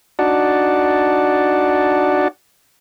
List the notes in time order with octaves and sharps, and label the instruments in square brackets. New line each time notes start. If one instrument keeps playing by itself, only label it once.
[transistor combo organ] D4 D#4 F#4 D5 F#5 A5